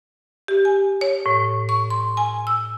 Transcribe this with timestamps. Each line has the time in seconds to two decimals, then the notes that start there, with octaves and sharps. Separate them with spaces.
0.48 G4
0.65 G#5
1.01 C#5
1.26 A2
1.69 C#6
1.90 C6
2.17 G#5
2.47 E6